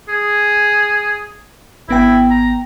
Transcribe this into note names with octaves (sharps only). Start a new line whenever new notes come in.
G#4
G#1 B3 E4 G5
A#5